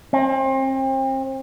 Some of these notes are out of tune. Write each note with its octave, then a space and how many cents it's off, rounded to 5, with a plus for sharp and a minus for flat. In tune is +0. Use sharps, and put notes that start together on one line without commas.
C4 +35